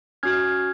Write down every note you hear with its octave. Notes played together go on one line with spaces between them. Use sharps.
C#4 F#4 F6 G#6